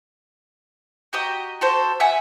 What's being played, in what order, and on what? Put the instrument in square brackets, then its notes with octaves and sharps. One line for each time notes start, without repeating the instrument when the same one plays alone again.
[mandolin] F#4 G4 D#5 A#5
F#4 A4 C5
E5 F#5 G#5